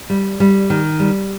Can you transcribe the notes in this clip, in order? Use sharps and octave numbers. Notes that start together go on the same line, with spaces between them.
G3
G3
D#3
G3